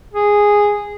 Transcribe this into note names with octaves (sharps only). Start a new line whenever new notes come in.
G#4